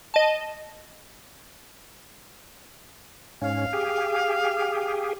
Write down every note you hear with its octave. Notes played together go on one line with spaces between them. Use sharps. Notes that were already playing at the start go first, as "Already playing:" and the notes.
D#5 A5
G#2 C#4 F5
G4 G#4